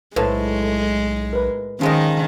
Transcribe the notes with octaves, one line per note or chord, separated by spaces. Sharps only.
B1 A2 G#3 B4 C5 A5
A#4 B4
D#3 F3 G#3 C#4 G#4 A#4 D#5